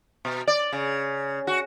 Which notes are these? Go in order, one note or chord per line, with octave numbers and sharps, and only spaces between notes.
B2
D5
C#3
F#4